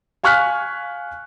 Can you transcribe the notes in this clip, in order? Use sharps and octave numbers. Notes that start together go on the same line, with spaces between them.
F5 G#5 C#6 F6 F#6 B6